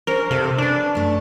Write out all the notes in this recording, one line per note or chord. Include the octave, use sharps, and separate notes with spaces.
C#4 D4 A#4 C5
C3 A4 F5
C#4 D4 B4
F#2 A3